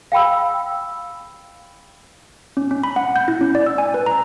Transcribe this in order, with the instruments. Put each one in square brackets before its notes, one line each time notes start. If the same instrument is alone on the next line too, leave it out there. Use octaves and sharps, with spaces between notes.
[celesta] F5 G5 B5 E6
[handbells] C#4
C#4
B5
F#5
G6
E4
C#4
D5
E6
G#5
B4
A#5